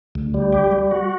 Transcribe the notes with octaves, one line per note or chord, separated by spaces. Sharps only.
D2
G3
G4
G3
F#4